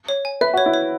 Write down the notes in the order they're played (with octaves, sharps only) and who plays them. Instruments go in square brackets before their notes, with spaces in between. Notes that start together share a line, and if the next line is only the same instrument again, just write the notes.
[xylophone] C#5
G#5
[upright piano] B4 [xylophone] E5
[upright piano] F#4 [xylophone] C#5
[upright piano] E4
[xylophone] C#5